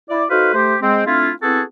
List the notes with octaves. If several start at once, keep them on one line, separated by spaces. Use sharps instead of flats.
E4 D5
D#4 F#4 A4 B4 C5 F5
A3 G4 C5
G#3 C4
A3 C4 D4 E4 F4
B3 C4 E4 F#4 G#4 A4